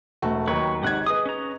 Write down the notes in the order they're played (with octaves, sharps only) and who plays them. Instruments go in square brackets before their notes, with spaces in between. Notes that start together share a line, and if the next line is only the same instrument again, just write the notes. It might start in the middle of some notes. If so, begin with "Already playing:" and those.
[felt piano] E1 A3 F#4
[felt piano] D#2 D#3 F#3 [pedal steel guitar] B4 C#5
[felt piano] G#1 G#2 G#6 [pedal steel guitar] G4 F#5 F#6
[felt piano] G#4 B4 D#5 [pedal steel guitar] D#6
[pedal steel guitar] C#4 A#5